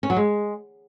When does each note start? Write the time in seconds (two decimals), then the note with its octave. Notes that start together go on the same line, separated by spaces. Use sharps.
0.03 C#4
0.10 F#3
0.16 G#3